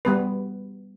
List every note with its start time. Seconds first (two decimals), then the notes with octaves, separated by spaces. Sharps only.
0.05 G3 B3 B4